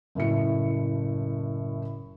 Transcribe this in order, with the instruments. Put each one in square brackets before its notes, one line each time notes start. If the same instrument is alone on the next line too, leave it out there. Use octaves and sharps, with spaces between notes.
[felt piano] F#1 A2 E4 F#4 C#7